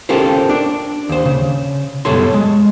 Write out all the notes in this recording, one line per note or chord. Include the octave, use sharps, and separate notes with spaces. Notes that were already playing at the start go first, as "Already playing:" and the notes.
C#4 F4 G4 A4 A#4 C5
D4 D5
D#2 C5
C#3
F#2 B2 G3 A4 C#5 C6
G#3